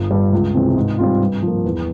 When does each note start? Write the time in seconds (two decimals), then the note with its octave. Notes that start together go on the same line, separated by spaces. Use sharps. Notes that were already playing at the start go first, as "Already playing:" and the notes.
Already playing: G1
0.11 G2 G3
0.33 C#2
0.55 C3 E3 G#3 C4
0.76 G#2
0.99 G3 C4 F4
1.20 G2
1.42 F3 A#3
1.65 E2